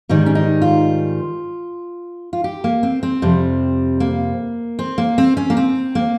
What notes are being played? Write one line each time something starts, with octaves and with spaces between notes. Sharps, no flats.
G#2 D#3 G3 D#4
C#4
D#4
F4
F4
G4
A#3
C4
C4
F2 C3 G3
A#3
C4
A#3
C4
C#4
A#3
C4
A#3